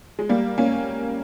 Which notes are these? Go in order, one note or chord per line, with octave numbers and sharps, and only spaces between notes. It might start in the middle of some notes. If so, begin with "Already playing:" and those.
G#3
G3 A#3
A#3 C#4